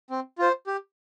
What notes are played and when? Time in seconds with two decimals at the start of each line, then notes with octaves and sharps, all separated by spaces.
0.10 C4
0.38 F4 C5
0.67 G4